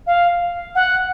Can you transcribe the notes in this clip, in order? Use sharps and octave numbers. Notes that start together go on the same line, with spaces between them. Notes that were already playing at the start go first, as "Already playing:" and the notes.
F5
F#5